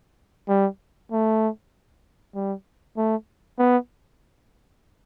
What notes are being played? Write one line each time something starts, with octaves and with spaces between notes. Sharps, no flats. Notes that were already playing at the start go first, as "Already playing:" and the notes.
G3
A3
G3
A3
B3